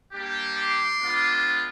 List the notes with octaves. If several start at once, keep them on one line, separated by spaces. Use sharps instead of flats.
G3 A#3 D4 G4
C6 D6
G#3 B3 D4 F4